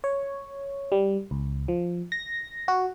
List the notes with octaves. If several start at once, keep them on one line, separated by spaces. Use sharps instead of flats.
C#5
G3
C#2
F3
A#6
F#4